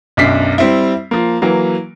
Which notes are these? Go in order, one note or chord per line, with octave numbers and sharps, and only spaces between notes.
B1 F#2 D4 B6 C7
G3 C4 E4
F3 A#3
E3 F#3 A#3